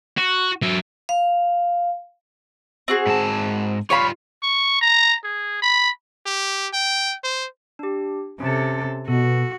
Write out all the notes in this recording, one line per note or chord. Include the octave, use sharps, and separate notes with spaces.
F#4
F#3 E5
F5
C4 F#4 G#4
G#2 A5
G3 F4 C#5 F5 B5
C#6
A#5
G#4
B5
G4
G5
C5
D4 G4
C3 C#4 A4
B2 F#4 A4